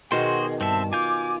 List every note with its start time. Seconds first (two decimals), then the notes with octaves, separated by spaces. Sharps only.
0.12 B2 D#3 F#4 G#4 C5 D#5 C6
0.61 G2 C4 E5 A5
0.93 F4 G#5 D6 G6